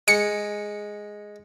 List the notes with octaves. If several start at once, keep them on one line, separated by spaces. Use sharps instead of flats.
G#3 C#7